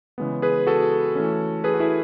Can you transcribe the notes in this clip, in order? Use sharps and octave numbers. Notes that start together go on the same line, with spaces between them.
C#3 E3 G#3 B3
G#4 B4
F#4 A4
E3 A3 C#4
G#4 B4
F#4
E4 G#4